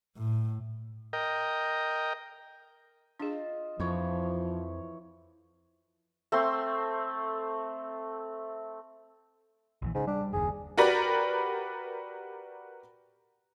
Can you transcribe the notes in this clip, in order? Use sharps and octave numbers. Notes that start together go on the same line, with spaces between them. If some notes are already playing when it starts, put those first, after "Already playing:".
A2
A#4 D#5 G5
D4 F4 G#4 D#5
F2 E3 F3 C#5
A3 C4 C6
A#1 A#2 E3
G#2 C#3
G3 D4
F#1 D#2 G#4
F#4 G4 A#4 B4 D5 B5